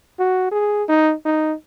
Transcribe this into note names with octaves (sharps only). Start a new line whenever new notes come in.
F#4
G#4
D#4
D#4